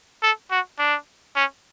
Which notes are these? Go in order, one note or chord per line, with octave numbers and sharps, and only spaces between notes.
A4
F#4
D4
C#4